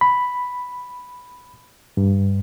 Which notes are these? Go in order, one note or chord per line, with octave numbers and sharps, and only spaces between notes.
B5
G2